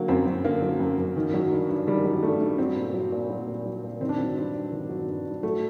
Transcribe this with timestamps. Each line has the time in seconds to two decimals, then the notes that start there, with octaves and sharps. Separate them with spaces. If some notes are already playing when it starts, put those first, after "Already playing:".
Already playing: D3 F#3 A#3
0.08 F#2 C4
0.26 F#2
0.45 D3 A#3
0.62 F#3
0.80 F#2
0.98 F#2
1.16 D#3
1.34 F#3
1.52 G2
1.69 G2
1.87 D#3 G3
2.05 F#3
2.23 G2 A3
2.41 G2
2.58 F#3 C4
2.76 A#2
2.94 F#3
3.12 A#2
3.29 F#3
3.47 A#2
3.66 F#3
3.84 A#2
4.01 D#3 C4
4.09 D4
4.17 F#3 C4
4.37 G2
4.54 G2
4.72 D#3
4.89 F#3
5.08 G2
5.26 G2
5.43 F#3 A3